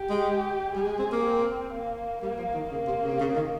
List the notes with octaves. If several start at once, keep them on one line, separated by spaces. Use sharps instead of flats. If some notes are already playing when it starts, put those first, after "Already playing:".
Already playing: G4
G#3
G3 G#4
G#3
C4
A#3
C4
A#3
G3 A#3
F3
D#3
C#3 A#3
C3
C#3
C3
C#3
D#3